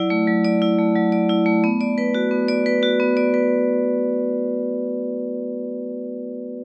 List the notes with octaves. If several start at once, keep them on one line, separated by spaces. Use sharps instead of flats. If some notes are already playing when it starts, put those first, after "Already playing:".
Already playing: F#3 E4 D5
A3
F#3
D5
E4
A3
F#3
D5
E4
A3
B3
D5
B4
F#4
B3
D5
B4
F#4
B3
D5
B4